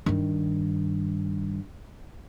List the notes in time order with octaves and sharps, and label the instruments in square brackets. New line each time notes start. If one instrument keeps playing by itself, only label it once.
[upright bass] G2 D#3